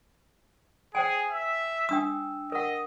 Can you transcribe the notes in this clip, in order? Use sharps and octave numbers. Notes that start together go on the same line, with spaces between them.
G#4 C5 G5 G#5
E5
D4 G5 D#6 E6
A#4 D#5 F#5